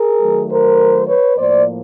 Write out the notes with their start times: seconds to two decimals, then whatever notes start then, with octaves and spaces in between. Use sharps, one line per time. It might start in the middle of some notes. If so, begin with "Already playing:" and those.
Already playing: G#4 A#4
0.21 D#3 F#3 A3
0.50 A#4 C5
1.07 B4 C#5
1.37 A2 F3 A#3 C5 D5